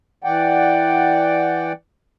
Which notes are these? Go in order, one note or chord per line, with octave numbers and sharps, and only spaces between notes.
E3 D5 F#5 G5